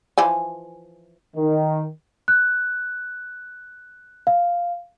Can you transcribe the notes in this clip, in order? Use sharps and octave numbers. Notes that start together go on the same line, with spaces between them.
E3 F3 G#5
D#3
F#6
F5